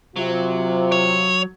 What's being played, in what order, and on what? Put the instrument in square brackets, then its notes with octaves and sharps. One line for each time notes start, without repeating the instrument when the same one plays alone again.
[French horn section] C3 F4 [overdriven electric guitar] F#3
[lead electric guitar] C#5